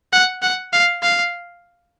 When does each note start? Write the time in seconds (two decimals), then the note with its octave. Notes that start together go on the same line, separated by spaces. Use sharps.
0.13 F#5
0.42 F#5
0.73 F5
1.02 F5